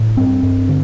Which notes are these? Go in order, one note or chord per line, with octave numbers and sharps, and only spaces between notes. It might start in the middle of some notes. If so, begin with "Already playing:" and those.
Already playing: A2
G2 C4
G2
D3